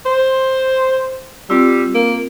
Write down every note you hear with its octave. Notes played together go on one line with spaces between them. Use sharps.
C5
G3 C4 F4 E6
A#3